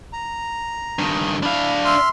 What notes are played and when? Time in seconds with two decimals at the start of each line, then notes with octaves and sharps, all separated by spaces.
0.13 A#5
0.99 G2 D#3
1.43 D4 E4 F5
1.85 E5 C6 F6